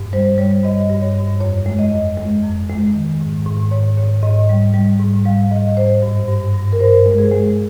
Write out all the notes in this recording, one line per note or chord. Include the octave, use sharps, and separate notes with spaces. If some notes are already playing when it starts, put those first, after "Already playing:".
Already playing: G2
G3 C5
G3 C#5
G2 D#5
G2
C#5
G2
F2 C#5
G#3
D#5
F2
G#3
F2
G#3
D#3
G#2
G#2
G#2 C#5
G#2 C#5
G#2 D#5
G3
G3
G#2
G3 F5
G#2 D#5
G#2 C5
G2
G2
G2
A#4
G2 C5
G#3
G#4
G#3